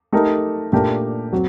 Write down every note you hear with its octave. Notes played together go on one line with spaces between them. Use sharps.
A3 D#4 G4 A#4
A#2 A3 D4 G4 A#4
F#3 C4 F#4